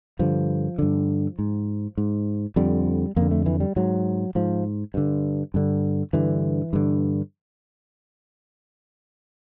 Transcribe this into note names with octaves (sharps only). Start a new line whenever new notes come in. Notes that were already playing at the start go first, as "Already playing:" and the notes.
G2 D3 F3
G2 D3
G#2
G#2
F2 D3 G3
F2 D3 A#3
A3
E3
G3
G#2 F#3
G#2 F3
G2 D3
G2 D3
G2 D3 E3
G2 D3